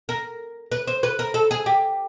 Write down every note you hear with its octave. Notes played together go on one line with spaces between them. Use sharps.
A#4
B4
C5
B4
A#4
A4
G#4
G4